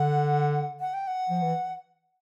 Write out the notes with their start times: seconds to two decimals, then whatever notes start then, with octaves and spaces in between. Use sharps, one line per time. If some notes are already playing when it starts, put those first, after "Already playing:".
Already playing: D3 F#5
0.80 F#5
0.94 G5
1.07 F#5
1.30 F3
1.42 E3